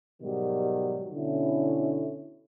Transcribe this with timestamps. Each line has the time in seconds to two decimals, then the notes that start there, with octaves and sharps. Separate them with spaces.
0.22 G#2 B2 D#3 F#3 G3
1.14 B2 D3 C#4 E4